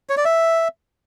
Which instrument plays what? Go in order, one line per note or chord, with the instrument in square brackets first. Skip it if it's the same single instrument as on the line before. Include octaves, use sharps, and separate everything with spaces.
[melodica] C#5
D5
E5